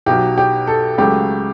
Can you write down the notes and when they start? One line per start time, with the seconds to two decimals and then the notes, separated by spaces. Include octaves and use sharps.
0.06 B1 B2 F#3 G4
0.38 G4
0.67 A4
0.98 C#2 C#3 F#3 A3 G4